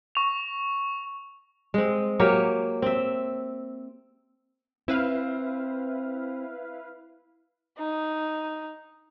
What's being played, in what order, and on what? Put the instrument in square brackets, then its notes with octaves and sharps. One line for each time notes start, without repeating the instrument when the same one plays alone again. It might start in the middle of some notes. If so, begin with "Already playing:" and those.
[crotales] C#6 F7
[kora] G#3 C4
F#3 A#3 G4 C#5
C4 E5
[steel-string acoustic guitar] C4 [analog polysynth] E4 B4 F5
[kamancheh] D#4